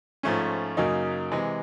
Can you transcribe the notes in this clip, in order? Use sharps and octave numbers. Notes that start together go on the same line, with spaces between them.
G#2 F3 A3 C#4
F#2 C#3 F#3 A#3 D#4
C3 E3 G#3